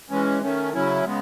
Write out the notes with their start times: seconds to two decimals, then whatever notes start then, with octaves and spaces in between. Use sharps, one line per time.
0.10 E3 G#3 C#4
0.41 D#3 A3 C#4
0.73 C#3 F#3 C#4 E4
1.05 C#3 G#3 B3